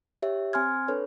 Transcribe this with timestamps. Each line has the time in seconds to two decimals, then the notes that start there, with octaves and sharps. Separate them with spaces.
0.22 G4 C#5 E5
0.53 C4 G#5 C6 F6 G#6
0.88 D4 A4 B4 C#5